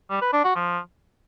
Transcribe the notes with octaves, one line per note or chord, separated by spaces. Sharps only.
G3
B4
D4
F#4
F3